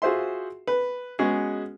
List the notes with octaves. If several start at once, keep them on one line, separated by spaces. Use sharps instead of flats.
F4 F#4 G#4 C5 E5 C6
B4
G#3 B3 C#4 F#4 G#4